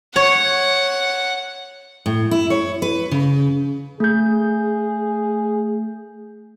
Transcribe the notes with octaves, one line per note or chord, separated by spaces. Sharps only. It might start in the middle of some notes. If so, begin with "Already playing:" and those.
C#5 F#5
A2
E4
C#5
B4
C#3
A3 G#4 G6